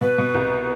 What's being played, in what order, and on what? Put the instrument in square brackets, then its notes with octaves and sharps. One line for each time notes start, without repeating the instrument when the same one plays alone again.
[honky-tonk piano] B2 [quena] B4
[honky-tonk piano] B2
C2